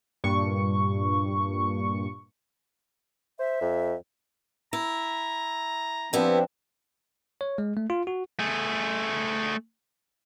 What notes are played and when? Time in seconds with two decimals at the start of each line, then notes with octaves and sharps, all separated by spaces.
0.24 G2 A#2 C#6
3.39 C5 E5
3.61 F2
4.73 E4 A#5
6.13 F3 B3 C4 D4 E4 G4
7.41 C#5
7.58 G#3
7.77 A3
7.90 F4
8.07 F#4
8.39 A3 G#4